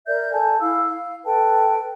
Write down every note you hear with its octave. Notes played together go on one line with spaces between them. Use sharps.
A#4 D5 E5 G6
A4 G#5 A5
E4 F5 E6
F5
A4 B4 G5 A5